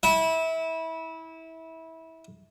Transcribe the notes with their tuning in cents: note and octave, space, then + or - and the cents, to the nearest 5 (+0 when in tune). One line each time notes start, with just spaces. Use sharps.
E4 -25